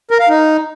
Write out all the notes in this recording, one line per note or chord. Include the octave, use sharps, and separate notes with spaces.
A#4
F5
D#4